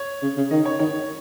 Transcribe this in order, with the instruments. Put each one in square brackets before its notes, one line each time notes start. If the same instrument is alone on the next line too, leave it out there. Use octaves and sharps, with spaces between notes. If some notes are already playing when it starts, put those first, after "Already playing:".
Already playing: [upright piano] C#5
[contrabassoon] C#3
C#3
[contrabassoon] D#3 [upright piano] D#5
[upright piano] C#5
[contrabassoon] D#3 [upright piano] C#5